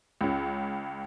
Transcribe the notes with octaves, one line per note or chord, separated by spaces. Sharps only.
C#2 C#4